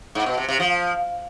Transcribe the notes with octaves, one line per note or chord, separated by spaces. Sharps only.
G#2
B2
C3
C3
F3